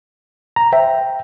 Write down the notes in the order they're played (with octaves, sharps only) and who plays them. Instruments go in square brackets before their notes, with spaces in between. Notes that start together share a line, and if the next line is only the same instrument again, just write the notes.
[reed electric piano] A#5
[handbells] C5 E5 [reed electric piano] G5